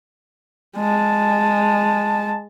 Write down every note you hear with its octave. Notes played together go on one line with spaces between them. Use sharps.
G#3 A5